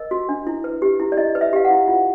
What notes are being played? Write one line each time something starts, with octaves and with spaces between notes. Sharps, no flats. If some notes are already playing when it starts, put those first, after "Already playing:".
Already playing: A#4 D#5
F#4
D4
E4
B4
G4
E4
D5
E4 D#5
B4
E5
G4 F5
F#5
E4
F4